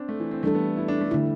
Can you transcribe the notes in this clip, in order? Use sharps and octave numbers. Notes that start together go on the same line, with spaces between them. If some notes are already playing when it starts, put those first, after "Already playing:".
Already playing: C4 D4
A3
E3
C4
E3 G3 A3 D4 A4
B3
E4
D4
A3
D3 G3 A3 E4